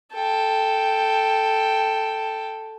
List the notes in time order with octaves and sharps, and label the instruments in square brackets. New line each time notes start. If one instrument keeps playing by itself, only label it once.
[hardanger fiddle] A4 G5